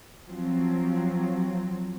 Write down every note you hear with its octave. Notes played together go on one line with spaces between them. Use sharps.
F3 F#3 C4